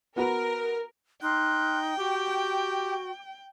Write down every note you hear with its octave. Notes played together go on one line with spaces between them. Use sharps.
B3 F#4 A#4 B4
D#4 G5 C6 F6 F#6
F#4 G4 D6